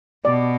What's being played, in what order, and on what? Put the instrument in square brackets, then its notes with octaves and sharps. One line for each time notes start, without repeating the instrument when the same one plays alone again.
[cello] B2 [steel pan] D5